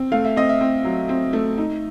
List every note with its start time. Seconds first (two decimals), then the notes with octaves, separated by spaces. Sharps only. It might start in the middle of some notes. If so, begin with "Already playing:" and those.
Already playing: C4
0.12 A3 F5
0.25 E5
0.36 C4 D#5
0.49 E5
0.61 C4
0.85 F#3
1.09 C4
1.33 A3
1.58 D#4